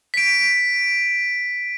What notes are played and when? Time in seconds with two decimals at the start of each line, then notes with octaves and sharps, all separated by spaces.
0.14 B6 D7